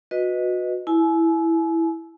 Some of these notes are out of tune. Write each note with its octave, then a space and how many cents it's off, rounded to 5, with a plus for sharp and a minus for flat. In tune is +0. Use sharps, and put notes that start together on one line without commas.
F#4 -25 B4 +0 D#5 +0
E4 +0 G#5 +40